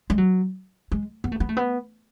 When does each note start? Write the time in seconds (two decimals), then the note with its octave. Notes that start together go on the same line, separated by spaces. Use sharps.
0.10 G#3
0.18 F#3
0.92 G#3
1.24 B3
1.32 A3
1.40 B3
1.49 A3
1.57 B3